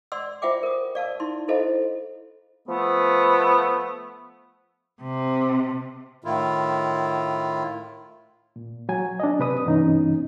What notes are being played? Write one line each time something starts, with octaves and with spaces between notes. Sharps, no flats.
D5 F#5 C6 E6
F4 C5 E5 F#5 G5 D6
A#4 D#6
D5 F5 A5 E6
D#4 E4 C6
E4 F4 A4 C5 D#5 F5
F3 A3 B3
C3
A2 D#3 E4 F4
A#2
F#3 G#5
D4 D#5
C3 B4 D#6
G2 C3 E3 B3 C#4 D#4